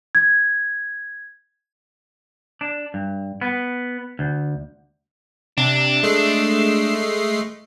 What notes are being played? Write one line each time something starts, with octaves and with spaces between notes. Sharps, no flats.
G#6
D4
G2
B3
D2
C3 D4
G#3 A3 C7